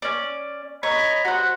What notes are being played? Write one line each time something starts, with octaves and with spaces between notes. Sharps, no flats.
C#4 D5
C#5 D#5 A#5 B5
F#4 C5 F#5